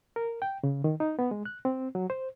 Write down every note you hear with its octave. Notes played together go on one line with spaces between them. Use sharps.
A#4
G5
C#3
D#3
D#4
B3
G#3
F#6
C4
F#3
C5